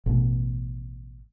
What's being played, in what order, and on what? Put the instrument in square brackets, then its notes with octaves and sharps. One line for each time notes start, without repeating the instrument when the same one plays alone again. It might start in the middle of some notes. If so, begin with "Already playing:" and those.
[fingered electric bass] A1 B2